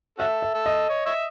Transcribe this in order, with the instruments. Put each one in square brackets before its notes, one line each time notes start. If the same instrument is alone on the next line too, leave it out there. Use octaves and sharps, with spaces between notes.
[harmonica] C#4 F#4 A4 [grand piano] E5
[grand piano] E5
[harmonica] A4
[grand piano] D#5
[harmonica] C#5
C#5 E5